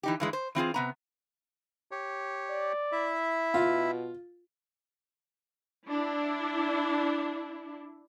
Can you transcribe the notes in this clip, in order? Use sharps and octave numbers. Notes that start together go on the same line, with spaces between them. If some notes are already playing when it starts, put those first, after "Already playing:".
E3 D#4 G4
G2 E3 G#3
C5
E3 C4 F4 G#4
C3 B3 A#5
G4 C#5
D5
E4 E5
B2 F4
D4 E4